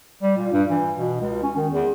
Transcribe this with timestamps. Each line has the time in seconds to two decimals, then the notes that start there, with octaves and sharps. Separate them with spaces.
0.22 G3
0.38 A#2
0.52 G2
0.70 E3
0.97 B2
1.21 C#2
1.43 C#4
1.56 D#3
1.72 E2